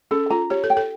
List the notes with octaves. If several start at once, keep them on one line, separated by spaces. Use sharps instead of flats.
C#4 A4
F4 A#5
G4 C#5
A4
G5
A4